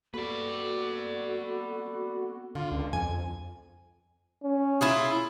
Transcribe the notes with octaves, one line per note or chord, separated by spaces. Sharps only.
A#3 B3 F#4 A4 B4 D5
D3 F4
C#2
F2 G#5
C#4
E4 F4 G#4